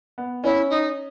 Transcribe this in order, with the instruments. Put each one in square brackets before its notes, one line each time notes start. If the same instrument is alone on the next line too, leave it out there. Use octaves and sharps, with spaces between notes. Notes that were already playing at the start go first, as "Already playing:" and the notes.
[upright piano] B3
[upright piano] C#4 [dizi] E4
[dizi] D#4